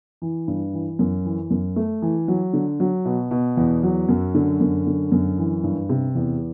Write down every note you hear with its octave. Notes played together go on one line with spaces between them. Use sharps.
E3
G2
E3
F#2
E3
F#2
A3
E3
F#3
D3
F#3
B2
B2
E2
F#3
F#2
D3
F#2
D3
F#2
E3
G2
C3
E2